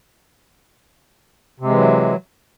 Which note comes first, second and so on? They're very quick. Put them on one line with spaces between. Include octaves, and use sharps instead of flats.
C3 G#3 E3 F#3